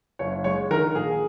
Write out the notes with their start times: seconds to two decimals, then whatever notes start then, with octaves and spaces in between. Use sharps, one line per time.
0.19 F#1 C#5
0.44 G#3 C#5
0.71 D#3 A#4
0.95 A#1 G#4